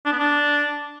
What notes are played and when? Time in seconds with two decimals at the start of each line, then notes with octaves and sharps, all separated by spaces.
0.06 D4
0.12 B3
0.19 D4